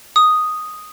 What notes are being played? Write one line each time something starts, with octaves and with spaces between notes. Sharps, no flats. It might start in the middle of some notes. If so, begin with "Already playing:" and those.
D#6